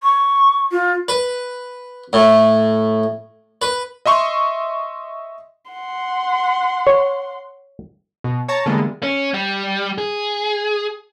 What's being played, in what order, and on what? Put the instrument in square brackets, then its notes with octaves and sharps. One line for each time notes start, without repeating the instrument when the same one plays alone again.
[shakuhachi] C#6
F4
[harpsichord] B4
A2
B4
[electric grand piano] D#5 E5 C6 C#6
[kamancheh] F#5 C6
[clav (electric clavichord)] C#5
[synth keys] B2
C#5 A5 A#5
D3 E3 G3 G#3 A#3 B3
[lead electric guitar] C#4
G3
G#4